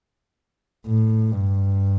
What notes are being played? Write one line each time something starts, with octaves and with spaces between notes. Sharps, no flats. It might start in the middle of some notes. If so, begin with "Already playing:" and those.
A2
G2